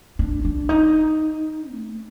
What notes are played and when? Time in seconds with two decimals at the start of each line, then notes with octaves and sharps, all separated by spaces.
0.19 D4
0.45 D4
0.69 D#4
1.72 A3